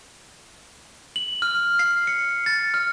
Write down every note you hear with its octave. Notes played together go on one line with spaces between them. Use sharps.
F#7
F6
C7
C#7
A6
F6